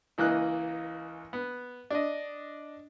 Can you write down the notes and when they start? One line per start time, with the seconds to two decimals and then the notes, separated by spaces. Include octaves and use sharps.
0.18 C#2 E3 A#3 D#5 F#6
1.33 B3
1.91 D4 D#5